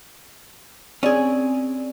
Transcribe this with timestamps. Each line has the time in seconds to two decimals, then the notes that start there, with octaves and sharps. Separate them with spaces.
1.03 C4 C#4 G#4 D5